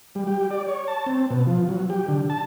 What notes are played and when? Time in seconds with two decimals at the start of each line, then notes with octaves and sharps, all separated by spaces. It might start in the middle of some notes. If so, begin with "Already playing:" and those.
0.15 G3
0.27 G4
0.51 D5
0.68 C#5
0.88 A5
1.06 C4
1.30 B2
1.47 F3
1.69 F#3
1.90 G4
2.08 D3
2.30 A5